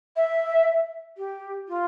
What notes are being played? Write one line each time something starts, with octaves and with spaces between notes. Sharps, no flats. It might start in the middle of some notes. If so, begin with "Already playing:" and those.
E5
G4
F4